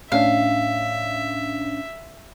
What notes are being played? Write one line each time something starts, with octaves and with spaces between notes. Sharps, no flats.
A2 C#4 D4 E5 F5